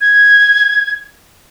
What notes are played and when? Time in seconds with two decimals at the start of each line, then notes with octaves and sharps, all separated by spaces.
0.01 G#6